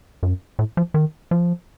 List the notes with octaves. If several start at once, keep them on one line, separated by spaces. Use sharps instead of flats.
F#2
A2
F3
D#3
F3